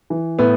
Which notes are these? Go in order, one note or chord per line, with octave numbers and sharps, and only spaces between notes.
E3
A2 B3